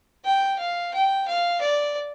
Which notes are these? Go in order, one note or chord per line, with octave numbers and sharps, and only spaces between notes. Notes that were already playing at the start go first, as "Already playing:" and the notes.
G5
F5
G5
F5
D5